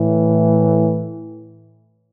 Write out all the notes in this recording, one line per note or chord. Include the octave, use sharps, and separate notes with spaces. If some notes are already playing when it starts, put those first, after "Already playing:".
Already playing: A2 E3